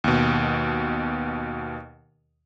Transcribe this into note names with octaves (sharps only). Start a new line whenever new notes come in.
D#2 B2